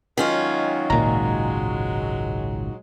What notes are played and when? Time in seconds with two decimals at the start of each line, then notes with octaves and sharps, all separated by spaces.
0.18 D#3 F#3 G#3 C#4 F4
0.90 G#1 C#2 A#2 A#5